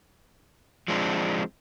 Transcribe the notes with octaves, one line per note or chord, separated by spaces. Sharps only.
F3 G#3 C4 D4